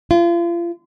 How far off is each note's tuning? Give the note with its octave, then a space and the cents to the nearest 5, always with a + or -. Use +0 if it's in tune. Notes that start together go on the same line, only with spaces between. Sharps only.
F4 -35